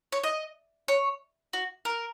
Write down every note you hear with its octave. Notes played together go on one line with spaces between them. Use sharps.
C#5
D#5
C#5
F#4
A#4